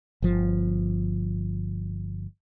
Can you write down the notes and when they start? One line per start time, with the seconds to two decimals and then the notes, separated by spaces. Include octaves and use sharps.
0.22 G1 F3